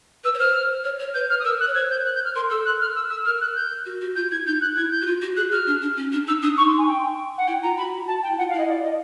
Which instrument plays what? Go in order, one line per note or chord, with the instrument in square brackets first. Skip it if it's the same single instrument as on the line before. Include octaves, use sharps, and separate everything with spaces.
[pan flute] B4 [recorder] E6
[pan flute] C#5
[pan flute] C5 [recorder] F6
[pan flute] C#5
C#5
[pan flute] B4 [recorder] G6
[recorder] F6
D#6
[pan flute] A#4 [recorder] E6
[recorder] F#6
[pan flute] C#5
[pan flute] C5 [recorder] G#6
[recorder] G6
F#6
G6
F6
[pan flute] A#4 [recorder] C6
[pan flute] A4 [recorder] E6
[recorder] F#6
F6
E6
E6
[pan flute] A#4 [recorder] F6
[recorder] F#6
G6
[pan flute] F#4
F#4
[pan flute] F4 [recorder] G6
[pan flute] E4 [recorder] G#6
[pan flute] D#4 [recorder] G6
[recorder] F#6
[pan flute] E4 [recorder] G#6
[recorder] G6
[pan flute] F#4
F4
F#4
[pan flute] G#4 [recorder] F#6
[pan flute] F#4 [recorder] F6
[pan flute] D4
D4
C#4
D4
[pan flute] D#4 [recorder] E6
[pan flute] D4 [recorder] D#6
[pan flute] D#4 [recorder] C#6
[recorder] C6
G#5
G5
F#5
[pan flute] E4 [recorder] G5
[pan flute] F4 [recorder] A#5
[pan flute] F#4 [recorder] B5
[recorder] A5
G5
[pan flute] E4
[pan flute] F4 [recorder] F#5
[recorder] F5
[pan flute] E4 [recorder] D#5
[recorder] D5
D#5